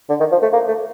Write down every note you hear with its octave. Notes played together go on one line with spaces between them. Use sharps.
D3
D#3
F3
A3
A#3
A3